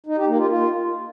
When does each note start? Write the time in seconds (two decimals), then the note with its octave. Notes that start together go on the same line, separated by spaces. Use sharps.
0.07 D#4
0.17 G4
0.28 A#3
0.38 F4
0.49 F4